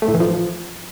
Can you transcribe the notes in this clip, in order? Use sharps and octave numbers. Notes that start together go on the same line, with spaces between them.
A3
A2
E3
F3